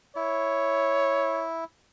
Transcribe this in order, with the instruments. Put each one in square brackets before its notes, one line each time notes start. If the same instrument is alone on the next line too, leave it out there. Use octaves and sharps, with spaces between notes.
[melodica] E4 [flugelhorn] C#5